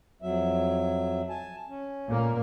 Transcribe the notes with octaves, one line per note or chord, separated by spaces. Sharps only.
F2 F#3 E5
G#5 A5
C#4
A#2 A#3